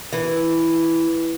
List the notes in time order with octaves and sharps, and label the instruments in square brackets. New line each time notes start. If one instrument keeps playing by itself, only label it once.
[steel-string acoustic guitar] E3